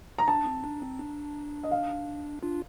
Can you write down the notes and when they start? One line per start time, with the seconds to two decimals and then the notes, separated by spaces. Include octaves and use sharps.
0.18 A#5
0.28 D4 A5
0.46 C4
0.64 D4
0.82 C4
0.99 D4
1.63 D#5
1.71 F5
2.42 D4 F4